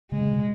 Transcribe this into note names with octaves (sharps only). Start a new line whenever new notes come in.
C#3 G#3
C#3
B2